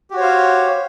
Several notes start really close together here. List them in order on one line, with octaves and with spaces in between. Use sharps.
G4 F#4 C#5 C5 F5